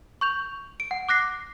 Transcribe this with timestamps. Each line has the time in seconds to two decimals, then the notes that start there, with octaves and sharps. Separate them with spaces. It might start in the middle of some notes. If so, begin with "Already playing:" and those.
0.21 C#6 G6 F7
0.80 D7
0.91 F#5
1.09 D6 F#6 A#6 C7